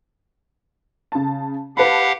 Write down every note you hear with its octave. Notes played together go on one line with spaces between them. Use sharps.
C#3 A5
G4 B4 F5 F#5 A5 B5